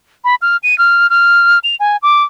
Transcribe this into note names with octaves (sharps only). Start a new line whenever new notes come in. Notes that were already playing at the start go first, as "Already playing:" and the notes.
B5
F6
D#7
F6
F6
F7
G#5
D6